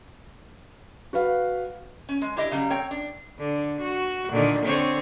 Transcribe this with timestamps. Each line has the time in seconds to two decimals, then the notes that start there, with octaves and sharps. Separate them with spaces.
1.13 F#4 B4 F5
2.09 C#4
2.22 G#3
2.36 D4 E4 G4 D#5 E5
2.51 C#3 F#3 G3
2.70 C4 C#5 G5
2.91 D4
3.38 D3
3.81 F#4
4.31 A#2 D3 D#3
4.65 D3 C4 C#5